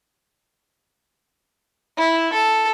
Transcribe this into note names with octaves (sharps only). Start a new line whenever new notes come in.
E4
A4